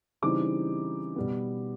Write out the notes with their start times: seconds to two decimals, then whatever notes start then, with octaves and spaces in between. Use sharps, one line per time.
0.22 C#3 E3 G3 C4 D#4 D6
1.16 B2 G3 B3